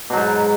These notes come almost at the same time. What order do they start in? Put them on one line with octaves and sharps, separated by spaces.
B2 F#3 G#2